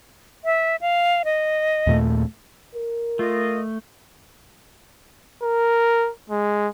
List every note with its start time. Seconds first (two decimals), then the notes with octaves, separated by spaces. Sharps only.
0.45 E5
0.81 F5
1.25 D#5
1.87 D#2 A#2 A3
2.76 A#4
3.19 A3 F4 D#5
5.43 A#4
6.30 G#3